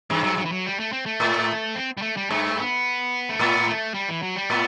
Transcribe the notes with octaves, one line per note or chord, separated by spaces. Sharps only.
G2 E3
F#3
F#3
E3
F#3
G3
A3
C4
A3
A2
C4
G3
A3
G3
G2 A3
B3
A3
A2 B3
A3
G3
E3
F#3
G3
A2 B3